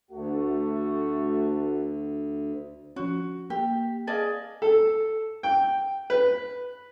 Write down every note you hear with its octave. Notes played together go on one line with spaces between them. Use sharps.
D2 A3 F#4
F3 C#4 F#4
A#3 G4
G#4 D5 D#5 F5 A5
A4
G5
B4